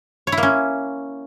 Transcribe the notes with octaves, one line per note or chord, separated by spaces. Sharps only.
C#5
E4
A#3
C#4